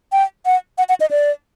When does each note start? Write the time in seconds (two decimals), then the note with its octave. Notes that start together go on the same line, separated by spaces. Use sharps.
0.12 G5
0.46 F#5
0.78 F#5
0.89 F#5
1.00 D#5
1.11 D5